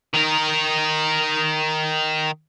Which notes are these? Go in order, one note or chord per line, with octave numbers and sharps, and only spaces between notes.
D#3 A#4